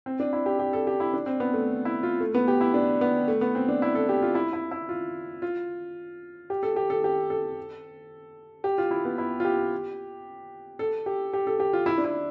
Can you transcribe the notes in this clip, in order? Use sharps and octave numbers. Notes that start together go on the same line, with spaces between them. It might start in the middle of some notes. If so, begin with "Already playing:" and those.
C4
D4
E4
G4
G4
A4
G4
E4
D4
C4
B3
A3
E4
F4
A3
B3
G4
E4
D4
B3
A3
B3
C4
D4
E4
A4
G4
F4
E4
E4
E4
F4
F4
G4
A4
G4
A4
G4
A4
G4
F4
E4
B3
E4
F4
G4
A4
G4
G4
A4
G4
F4
E4
D4
E4